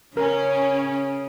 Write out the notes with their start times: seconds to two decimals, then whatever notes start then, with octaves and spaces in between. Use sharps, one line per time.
0.17 C#3 C#4 A#4